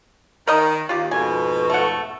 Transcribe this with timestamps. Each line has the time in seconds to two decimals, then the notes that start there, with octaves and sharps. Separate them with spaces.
0.47 D#3 A#4 D#5 A#5
0.89 D#2 F4 G4
1.11 F2 G#2 B2 G#5
1.70 A3 F#5